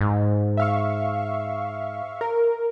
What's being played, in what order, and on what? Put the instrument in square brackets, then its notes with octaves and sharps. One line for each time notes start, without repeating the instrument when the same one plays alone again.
[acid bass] G#2
[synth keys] E5 F5 C#6
A#4